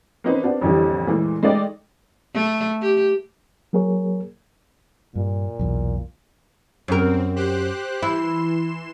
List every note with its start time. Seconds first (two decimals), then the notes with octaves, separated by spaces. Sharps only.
0.24 A#3 C4 C#4 D#4 F4 B4
0.44 B3 C4 D4 F4
0.61 A1 F2 D3 E3 G3
1.07 A#2 E3 G#3 A3
1.43 G#3 A3 D#4 D5 D#5 G5
2.35 A3
2.82 G4
3.73 F#3 A#3 G#4 A#4 C#5
5.16 G2 A#2
5.59 B1 E2
6.88 F#2 C4 A#4
7.36 G4 C5 F#6
8.03 E3 E4 C6 E7